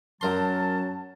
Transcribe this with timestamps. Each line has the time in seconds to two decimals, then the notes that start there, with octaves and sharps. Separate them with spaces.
0.21 F#2 F#3 C#4 A#4 A5 C6